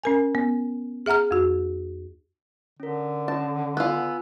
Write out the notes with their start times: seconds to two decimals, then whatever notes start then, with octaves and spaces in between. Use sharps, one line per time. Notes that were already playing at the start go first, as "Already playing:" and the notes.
0.04 C#4 A#4 G#5
0.35 B3
1.06 G#4 E5 F#5 A#5 F6
1.31 F2 F#4
2.80 D3 C#4 A#4
3.28 C#4 A5
3.77 B3 F4 G#5 E6 F#6